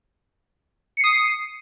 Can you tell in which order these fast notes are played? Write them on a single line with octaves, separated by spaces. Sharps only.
C#7 C7 D#6